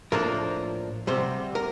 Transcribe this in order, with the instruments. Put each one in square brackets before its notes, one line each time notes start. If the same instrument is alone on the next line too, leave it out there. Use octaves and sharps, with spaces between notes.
[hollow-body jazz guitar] A2 F3 A#3 D4 A#4
D2 C3 G3 C5
A#4